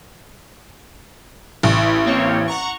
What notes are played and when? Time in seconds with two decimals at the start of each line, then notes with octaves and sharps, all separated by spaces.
1.63 A1
1.77 E4
2.06 A#3 C4 C#5
2.48 F#5 A#5 C#6